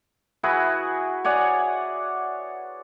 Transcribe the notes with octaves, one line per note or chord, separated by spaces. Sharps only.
E4 F#4 G#4 B4
C#5 D5 F#5 G#5